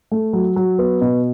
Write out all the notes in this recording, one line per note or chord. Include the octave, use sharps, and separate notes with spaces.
A3
F#3
F#3
B3
B2